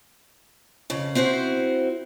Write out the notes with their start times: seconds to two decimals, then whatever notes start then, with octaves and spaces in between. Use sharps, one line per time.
0.90 F2 C#3
1.15 C4 E4 F#4 C5